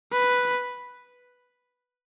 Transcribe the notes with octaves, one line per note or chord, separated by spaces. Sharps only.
B4